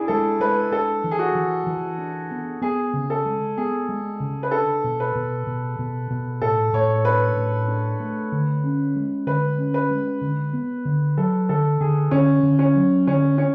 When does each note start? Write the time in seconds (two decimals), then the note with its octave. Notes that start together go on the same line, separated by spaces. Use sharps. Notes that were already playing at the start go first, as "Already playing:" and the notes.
Already playing: D4 E4 G#4
0.08 G#3 A4
0.40 G#3 B4
0.72 D4 A4
1.04 E3
1.11 G#4
1.19 F#4
1.35 E3
1.67 E3
1.98 D4
2.31 B3
2.62 B3 G#4
2.93 C#3
3.10 A4
3.25 G#3
3.57 B3 G#4
3.89 G#3
4.20 C#3
4.43 B4
4.51 D4 A4
4.84 B2
5.00 B4
5.15 B2
5.47 B2
5.79 B2
6.10 B2
6.41 A2 A4
6.73 A2 C#5
7.05 D4 B4
7.37 A2
7.68 D4
8.00 A3
8.32 D3
8.64 C#4
8.96 G#3
9.27 D3 B4
9.58 C#4
9.74 B4
9.90 G#3
10.21 D3
10.53 B3
10.85 D3
11.17 F#3 A4
11.49 D3 A4
11.80 D3 G#4
12.11 D3 C#4
12.43 D3
12.59 C#4
12.75 F#3
13.07 D3 C#4
13.38 C#4